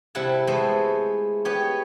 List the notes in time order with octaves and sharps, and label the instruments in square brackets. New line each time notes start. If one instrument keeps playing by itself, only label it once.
[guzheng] C3 G3 E4 F#5 A5
G#3 A3 B3 A4 C5
B3 G4 C#5